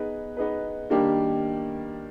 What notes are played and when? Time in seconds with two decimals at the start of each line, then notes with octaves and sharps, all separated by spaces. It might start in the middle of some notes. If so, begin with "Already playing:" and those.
Already playing: B3 D#4 G#4 B4
0.37 B3 D#4 G#4 B4
0.90 D#3 G3 A#3 D4 G4